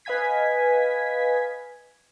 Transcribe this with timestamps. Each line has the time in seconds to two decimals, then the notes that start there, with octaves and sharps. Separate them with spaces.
0.05 B4 D#5 F5 G#5 G#6 B6